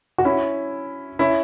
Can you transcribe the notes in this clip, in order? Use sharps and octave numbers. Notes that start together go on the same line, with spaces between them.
F#4
C#4 E4
C#4 E4